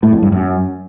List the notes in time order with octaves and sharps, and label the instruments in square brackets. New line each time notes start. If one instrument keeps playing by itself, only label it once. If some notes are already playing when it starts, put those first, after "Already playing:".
[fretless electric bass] A2
F2
G2
F#2